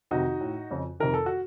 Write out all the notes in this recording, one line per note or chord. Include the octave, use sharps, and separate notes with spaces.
F2 C3 D#3 D#4 F#4
A2
F2 C#3
F2 C3 D#3 A#4
A4
F#4